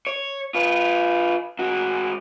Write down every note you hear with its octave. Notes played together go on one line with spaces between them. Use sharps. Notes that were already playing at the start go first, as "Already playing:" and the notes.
C#5
F4 B4
G#2 F#4